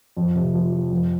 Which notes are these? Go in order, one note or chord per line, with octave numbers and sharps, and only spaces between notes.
F2
C3
F3
F3
F2